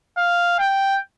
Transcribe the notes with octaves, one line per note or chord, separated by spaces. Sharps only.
F5
G5